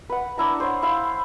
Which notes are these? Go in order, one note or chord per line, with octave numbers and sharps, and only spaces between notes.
B4 F#5
D4 E4 A#5
C5 C#5 F#5
E4 F5